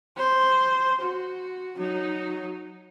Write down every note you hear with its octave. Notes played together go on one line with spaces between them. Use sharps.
C5
F#4
F#3 D#4